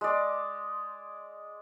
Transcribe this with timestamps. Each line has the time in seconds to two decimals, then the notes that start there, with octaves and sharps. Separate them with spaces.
0.01 G#3 D5